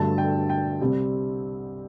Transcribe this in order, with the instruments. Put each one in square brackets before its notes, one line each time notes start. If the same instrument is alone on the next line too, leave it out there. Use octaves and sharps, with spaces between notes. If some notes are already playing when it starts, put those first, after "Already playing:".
Already playing: [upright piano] G1 G2 D3 F#3 A3 A5
G5
G5
C2 C3 G3 C4